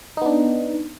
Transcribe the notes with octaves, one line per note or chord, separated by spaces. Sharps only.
B3 D4 D#4